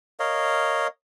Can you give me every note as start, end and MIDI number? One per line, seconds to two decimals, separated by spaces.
0.20 0.87 70
0.20 0.87 73
0.20 0.87 75
0.20 0.87 77